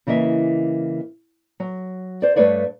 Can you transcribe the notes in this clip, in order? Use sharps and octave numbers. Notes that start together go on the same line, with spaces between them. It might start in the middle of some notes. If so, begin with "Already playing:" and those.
C#3 E3 A#3 D#5 E5
F#3
C5 D5
G2 A3 B4 C#5 D5 F5